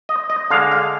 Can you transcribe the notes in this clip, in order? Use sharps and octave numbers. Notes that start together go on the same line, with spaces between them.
D#5
D#5
D3 G#3 F5
F5